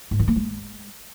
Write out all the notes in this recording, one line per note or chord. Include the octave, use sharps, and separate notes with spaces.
G#2
D#3
A#3
G#3